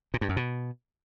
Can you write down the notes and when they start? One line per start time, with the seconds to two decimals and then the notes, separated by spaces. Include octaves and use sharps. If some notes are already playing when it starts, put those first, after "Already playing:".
0.14 A#2
0.21 G2
0.29 F#2
0.37 B2